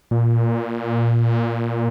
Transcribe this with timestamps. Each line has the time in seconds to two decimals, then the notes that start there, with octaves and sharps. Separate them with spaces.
0.11 A#2